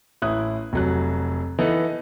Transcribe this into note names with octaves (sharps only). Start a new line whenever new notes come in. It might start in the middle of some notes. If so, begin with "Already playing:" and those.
A1 E4 D#6 F#6
F1 F#3 F#6
E3 B3 D#4 A4 D#5